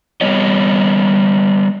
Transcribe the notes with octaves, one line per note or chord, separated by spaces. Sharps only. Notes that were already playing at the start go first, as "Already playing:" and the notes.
G3 B3 C#5 D#5